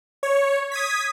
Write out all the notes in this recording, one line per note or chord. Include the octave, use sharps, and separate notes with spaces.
C#5
D#6 G#6 B6